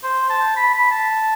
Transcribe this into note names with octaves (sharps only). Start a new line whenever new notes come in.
C5
A5
B5
B5
A5